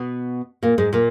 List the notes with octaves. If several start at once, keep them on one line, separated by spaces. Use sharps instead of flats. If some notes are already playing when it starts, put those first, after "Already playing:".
Already playing: B2 B3
A#2 A#3
G#2 G#3
A#2 A#3